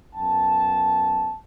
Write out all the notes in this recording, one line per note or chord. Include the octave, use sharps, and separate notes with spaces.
F#2 B3 G5 A5